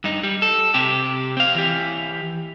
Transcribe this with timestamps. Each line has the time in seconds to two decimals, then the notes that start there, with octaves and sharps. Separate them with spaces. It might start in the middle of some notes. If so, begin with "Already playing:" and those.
0.04 G2 D#4
0.23 G3
0.42 A4
0.74 C3 G4
1.37 C4 F5
1.55 E3 G4